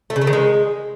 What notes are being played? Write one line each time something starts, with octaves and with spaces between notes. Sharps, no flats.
A3
C#3
A3
D#3
G#3